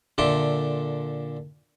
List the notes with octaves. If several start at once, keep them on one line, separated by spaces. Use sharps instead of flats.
A#2 D3 A4 E5 C6 D6